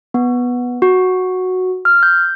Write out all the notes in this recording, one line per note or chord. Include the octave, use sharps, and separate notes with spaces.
B3
F#4
F6
G6